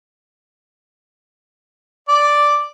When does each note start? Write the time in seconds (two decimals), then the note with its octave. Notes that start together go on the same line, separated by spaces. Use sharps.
2.09 D5